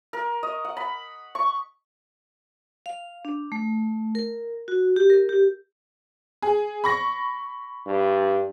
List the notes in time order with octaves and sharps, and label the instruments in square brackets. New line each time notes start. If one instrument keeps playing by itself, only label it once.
[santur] A#4
D#5
F#5
B5
C#6
[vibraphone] F5
D4
A3
A#4
F#4
G4
A#4
G4
[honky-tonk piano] G#4
B5 C#6 A#6
[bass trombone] G2